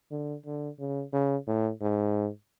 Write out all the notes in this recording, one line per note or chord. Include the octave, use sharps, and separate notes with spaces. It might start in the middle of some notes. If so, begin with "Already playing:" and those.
D3
D3
C#3
C#3
A2
G#2